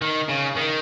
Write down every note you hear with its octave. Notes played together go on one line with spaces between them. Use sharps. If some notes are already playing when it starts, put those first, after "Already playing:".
D#3
C#3
D#3